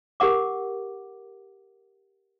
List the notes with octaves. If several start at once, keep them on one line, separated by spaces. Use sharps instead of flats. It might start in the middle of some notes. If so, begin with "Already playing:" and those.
G4 A#4 F#5 D6